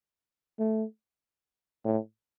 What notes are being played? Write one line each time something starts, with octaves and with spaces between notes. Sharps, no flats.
A3
A2